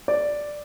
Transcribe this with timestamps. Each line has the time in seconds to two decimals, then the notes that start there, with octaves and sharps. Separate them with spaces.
0.08 D5